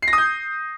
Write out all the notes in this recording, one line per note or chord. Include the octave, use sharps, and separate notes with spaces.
C7
A#6
D#6
G6